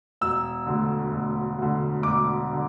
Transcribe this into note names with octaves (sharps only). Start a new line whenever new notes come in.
E1 E6
D2 D3
E1
D2 D3
E1 D6
D3